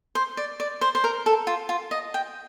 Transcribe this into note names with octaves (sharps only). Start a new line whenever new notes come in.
C5
D5
D5
C5
C5
A#4
A4
F4
F4
D#5
G5